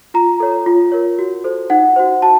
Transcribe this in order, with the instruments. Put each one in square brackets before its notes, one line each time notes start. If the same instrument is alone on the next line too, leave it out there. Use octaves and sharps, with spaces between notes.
[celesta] F4 A#5
A4 C#5
F4
A#4 C#5
F#4
A4 C5
D#4 F#5
F#4 C5
F#4 A5